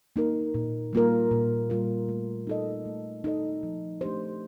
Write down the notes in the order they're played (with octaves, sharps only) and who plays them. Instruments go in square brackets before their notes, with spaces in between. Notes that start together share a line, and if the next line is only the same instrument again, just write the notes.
[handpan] A#3 D#4 A#4
A#2
G3 A#3 F4 A#4
A#2
G3 A#3 F4 A#4
A3
D#4 A4 D#5
A3
D#4 A4 D#5
F3
A3 D4 G4 C5